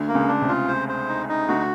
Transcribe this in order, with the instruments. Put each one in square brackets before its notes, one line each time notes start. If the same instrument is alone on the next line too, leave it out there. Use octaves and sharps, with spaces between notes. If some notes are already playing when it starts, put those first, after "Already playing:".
Already playing: [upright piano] D2 D3
[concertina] A#3
[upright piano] C#2 C#3
[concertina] D4
[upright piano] C3
[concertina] F4
C5
C5
D#4
D#4
[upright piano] D2 D3 [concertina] F#4